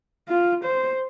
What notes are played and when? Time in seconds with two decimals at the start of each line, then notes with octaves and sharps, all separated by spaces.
0.28 F4
0.64 C5